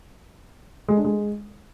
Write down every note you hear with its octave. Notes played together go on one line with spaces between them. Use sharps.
G#3
D4
G#3